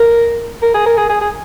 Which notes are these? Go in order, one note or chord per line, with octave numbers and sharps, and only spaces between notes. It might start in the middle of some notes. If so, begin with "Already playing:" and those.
Already playing: A#4
A#4
G#4
A#4
G#4
G#4
G#4